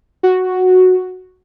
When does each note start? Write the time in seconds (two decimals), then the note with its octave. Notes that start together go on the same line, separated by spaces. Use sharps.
0.23 F#4